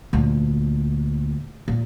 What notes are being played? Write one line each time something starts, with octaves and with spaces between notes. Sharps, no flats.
D2 A#2
A#2